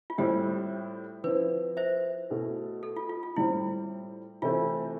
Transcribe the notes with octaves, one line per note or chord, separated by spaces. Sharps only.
F4
A2 G3 C4 E4 G4
F3 C4 E4 B4
C5 E5
B2 A3 E4
A4
F4
F4
F4
A2 G3 C4 E4
C3 E3 A3 C4 E4 F4